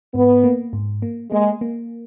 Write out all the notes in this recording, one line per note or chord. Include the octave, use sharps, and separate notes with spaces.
G#2 B3
A#3
G#2
A#3
G#3 A#3
A#3